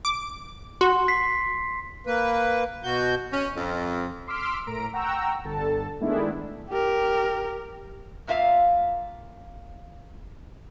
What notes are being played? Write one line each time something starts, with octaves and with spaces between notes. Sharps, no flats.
D6
F#4 C6
B6 C7
A#3 B4
B2 F#4 G6
C#4
F2
C6 D6 E6 F6 B6 D7
A2 A#4 A#5 D7
F#5 G5 A#5 C#6 E6
G1 D3 A4 A5
D#3 G#3 A3 B3 D4 E4
G4 A#4
F#2 A#3 F4 E5 F5